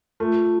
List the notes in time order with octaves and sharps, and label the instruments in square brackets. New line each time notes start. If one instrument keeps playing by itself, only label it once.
[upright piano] A3 [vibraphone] F4